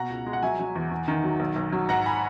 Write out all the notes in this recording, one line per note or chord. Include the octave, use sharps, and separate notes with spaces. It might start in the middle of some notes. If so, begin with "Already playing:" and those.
Already playing: B2 F#5 A#5
C#2
G#3
F#5
F#3 E5 G#5
F#3
E2
E2
D#3
F#3
B1
B1
F#3
G#2 F#5 A#5
G#5 B5